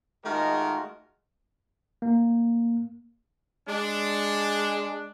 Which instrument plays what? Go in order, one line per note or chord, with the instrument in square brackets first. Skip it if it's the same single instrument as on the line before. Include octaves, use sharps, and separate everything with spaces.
[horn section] D#3 G#3 A3 F4 F#4 A#4
[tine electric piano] A#3
[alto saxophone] G#3 [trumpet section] D4